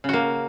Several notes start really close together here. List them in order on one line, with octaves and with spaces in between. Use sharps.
C#3 F#4 A#3